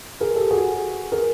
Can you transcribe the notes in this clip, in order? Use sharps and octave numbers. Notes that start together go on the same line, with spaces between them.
G#4 A#4
G4 A4
F#4 G#4
G#4 A#4